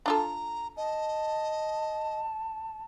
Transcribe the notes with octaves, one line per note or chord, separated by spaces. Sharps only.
D4 F4 A4 A#5
D#5 A5